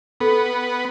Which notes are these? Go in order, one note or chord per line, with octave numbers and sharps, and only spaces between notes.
B3 A4